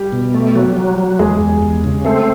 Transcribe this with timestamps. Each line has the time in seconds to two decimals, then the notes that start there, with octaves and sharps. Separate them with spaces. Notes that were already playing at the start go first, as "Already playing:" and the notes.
Already playing: G3 G4
0.13 B2
0.34 A3
0.56 F#3
0.77 F#3
0.98 F#3
1.19 E2 G#3 G#4
1.41 E2
1.62 E2
1.84 C#3
2.05 A3 C4 A4